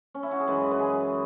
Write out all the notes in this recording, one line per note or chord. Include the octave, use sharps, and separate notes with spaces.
C#4
E4
F#4
G#4
F#2 E3 G#3 B4
B4
G#4